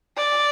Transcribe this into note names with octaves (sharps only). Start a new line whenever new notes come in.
D5